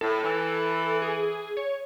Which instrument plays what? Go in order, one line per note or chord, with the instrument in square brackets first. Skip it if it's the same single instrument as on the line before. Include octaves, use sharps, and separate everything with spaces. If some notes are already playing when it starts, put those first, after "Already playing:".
[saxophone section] A2 [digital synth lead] A4
[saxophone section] E3
[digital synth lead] G#4
C#5